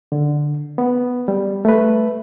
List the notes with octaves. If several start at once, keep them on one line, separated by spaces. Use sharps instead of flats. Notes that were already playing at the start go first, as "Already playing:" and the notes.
D3
B3
G3
A3 B4